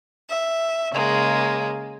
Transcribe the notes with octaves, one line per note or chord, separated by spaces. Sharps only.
E5
C#3 G#3 A#3